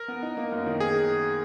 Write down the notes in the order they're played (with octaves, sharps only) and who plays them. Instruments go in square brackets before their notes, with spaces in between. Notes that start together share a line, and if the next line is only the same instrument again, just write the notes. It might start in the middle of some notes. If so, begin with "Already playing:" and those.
Already playing: [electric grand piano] A#4
[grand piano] B3
D#4
A#3
F#2
D#3
[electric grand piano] G#4